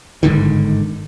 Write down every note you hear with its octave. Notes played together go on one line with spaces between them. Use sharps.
G1 G#2 D3 D#3